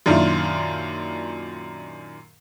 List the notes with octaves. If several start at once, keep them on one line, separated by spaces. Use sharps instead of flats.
F#2 A#2 D#3 D4 E4 F4